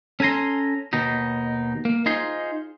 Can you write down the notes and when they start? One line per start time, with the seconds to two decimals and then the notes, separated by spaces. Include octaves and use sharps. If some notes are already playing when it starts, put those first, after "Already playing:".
0.20 C#4 A4 G#5 A#5 C6
0.93 D#2 B2 D#4
1.85 A#3
2.06 D#4 F4 G#4 C5 C6